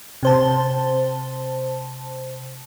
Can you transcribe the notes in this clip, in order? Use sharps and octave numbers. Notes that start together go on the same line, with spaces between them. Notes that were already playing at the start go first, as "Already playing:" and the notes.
C3 C5 A5